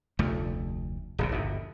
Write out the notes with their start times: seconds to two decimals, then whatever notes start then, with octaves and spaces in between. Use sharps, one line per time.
0.19 F1 D2 A3
1.18 D1 A#1 C3
1.32 G1 D#2 B2